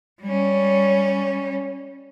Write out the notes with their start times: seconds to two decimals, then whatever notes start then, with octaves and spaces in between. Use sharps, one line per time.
0.22 G3 C#4